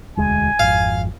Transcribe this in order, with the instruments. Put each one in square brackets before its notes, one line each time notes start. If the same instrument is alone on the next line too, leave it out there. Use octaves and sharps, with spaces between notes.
[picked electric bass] E1 D2 G#3 [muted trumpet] G#5
[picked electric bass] G#1 F2 [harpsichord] F5